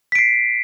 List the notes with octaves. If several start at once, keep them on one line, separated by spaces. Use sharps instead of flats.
B6 C7 D7